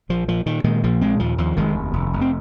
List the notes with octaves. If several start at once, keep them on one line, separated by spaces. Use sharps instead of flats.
A#1 F3
A#2 F3
A#2 D#3
A#2 D#3 G#3
A#1 F3 A#3
A#2 G#3 C4
D#2 F3
D#2 F3
F1 D#3 G#3
D#2
F1
F1
C4